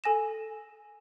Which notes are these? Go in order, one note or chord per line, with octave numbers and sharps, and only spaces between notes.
A4 G#5 A#6 E7